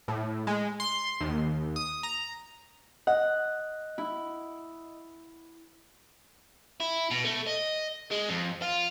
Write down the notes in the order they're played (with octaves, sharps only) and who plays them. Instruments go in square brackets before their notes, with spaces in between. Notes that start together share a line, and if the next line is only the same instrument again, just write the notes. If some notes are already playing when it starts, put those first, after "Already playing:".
[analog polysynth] A2
G#3
C6
D#2
D#6
A#5
[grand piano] D#5 [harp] F#5
[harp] E4
[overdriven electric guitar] E4
B2
A3
D#5
G#3
F2
F4